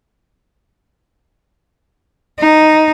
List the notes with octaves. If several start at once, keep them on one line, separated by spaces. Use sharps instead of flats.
D#4